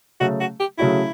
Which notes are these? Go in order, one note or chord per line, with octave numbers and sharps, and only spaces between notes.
C#3 F#3 A3 F#4
F#4
G4
C#3 F#3 A3 C#4 E4 F#4